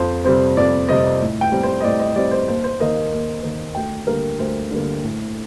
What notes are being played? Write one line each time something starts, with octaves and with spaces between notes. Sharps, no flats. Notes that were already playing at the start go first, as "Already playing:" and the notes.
Already playing: F2 C5
C3 G3 C4 C5
F2 D5
C3 G3 C4 D#5
A2
G5
G3 C4
C5
D#5
A2 D5
D#5
G3 C4 D5
C5
D#2 C5
C5
D#3 A#3 D#5
D#2
D#3 A#3
D2 G5
D3 G3 A#3 A#4
D2 C5
D3 G3 A#3
A2